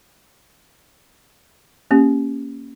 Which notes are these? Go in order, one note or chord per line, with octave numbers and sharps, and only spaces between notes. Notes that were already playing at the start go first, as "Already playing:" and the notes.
A#3 C#4 G4